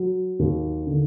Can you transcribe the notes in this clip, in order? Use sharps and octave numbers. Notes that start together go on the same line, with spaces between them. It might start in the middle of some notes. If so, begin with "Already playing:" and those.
Already playing: F#3
D#2
D3